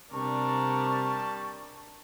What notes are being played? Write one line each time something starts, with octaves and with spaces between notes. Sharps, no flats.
C3 G3 D4 A#4 D5 A5 C#6